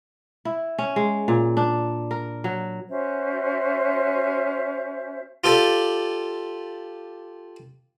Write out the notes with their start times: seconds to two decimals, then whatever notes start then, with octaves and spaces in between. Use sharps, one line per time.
0.45 E4
0.79 C#4
0.96 G#3
1.28 A#2
1.57 D4
2.11 A#4
2.44 F#3
2.88 C#4 F#4 C5 E5
5.44 F4 G4 A4 D5